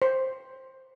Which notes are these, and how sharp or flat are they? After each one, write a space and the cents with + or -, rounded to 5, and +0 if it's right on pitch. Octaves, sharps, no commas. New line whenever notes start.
C5 +10